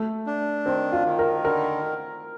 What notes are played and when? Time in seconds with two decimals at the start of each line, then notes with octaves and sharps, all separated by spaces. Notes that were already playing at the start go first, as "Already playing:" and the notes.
Already playing: A3
0.26 D4
0.66 D#3 C4
0.92 F4
1.06 D#3
1.19 A#4
1.44 D3 A#4